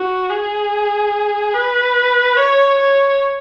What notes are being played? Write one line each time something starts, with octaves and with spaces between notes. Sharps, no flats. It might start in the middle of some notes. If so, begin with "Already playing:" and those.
Already playing: F#4
G#4
B4
C#5
C#5